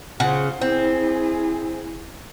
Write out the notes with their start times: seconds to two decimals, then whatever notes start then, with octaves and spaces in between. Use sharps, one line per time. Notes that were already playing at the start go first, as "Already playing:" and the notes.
0.20 C#3 F4 C5 F#5
0.61 C4 E4 G#4